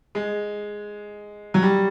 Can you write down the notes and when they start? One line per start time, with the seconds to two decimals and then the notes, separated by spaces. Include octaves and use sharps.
0.15 G#3
1.54 F#3
1.62 G3